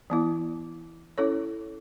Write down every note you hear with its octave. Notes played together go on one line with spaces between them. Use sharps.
E3 B3 E4
C#4 E4 A4 C#5